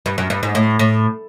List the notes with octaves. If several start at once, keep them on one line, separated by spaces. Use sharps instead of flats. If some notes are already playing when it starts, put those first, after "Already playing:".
G2
F#2
G2
G#2
A2
A2